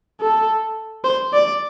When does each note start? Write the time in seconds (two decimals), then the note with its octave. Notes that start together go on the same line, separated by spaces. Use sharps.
0.21 A4
1.04 C5
1.33 D5